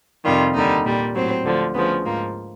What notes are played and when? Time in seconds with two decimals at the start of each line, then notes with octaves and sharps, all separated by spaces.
0.25 F2 C3 D#3 G3 F4
0.54 D#2 D3 G3 D#4
0.85 A#2 G3
1.15 A2 F#3 C4
1.44 D2 D3 F3
1.74 D2 C#3 F3 B3
2.05 G#2 F3 A#3